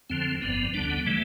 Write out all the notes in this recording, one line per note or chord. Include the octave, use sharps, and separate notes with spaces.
F2 D3 F3 C4
G1 G2 F3 B3
D2 D3 G3 D4
B3
C3 E3 G3 A3